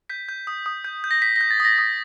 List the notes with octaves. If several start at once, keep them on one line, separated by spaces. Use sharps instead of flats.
G6 B6
G6
D#6
D#6
G6
G6
A#6
G6 B6
G6 A#6
A6
D#6 A#6
D#6